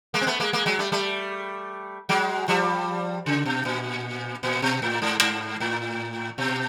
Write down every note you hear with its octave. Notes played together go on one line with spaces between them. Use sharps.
G#3 A#3
C4
A3 B3
G#3 A#3
G#3 A#3
F#3 G#3
G3 A3
G3 A3
F#3 G#3
F3 G3
C#3
B2
A#2
A#2
B2
A2
G#2
G#2
A2
B2